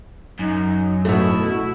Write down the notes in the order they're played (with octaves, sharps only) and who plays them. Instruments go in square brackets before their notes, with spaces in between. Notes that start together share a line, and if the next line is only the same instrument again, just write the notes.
[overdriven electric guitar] F#2 [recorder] D#4
[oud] B2 A3 [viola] E4 [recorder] F#4